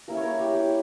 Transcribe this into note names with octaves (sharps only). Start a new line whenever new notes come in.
G3 A#3 C#4 E4 A#4
C#5
A#4
G4
G4